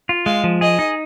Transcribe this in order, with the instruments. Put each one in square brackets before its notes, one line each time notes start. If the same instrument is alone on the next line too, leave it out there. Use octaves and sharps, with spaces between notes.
[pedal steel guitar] F4
[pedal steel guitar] G#3 [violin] F5
[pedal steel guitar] F3
[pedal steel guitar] G#4 [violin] D#5
[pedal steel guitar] D#4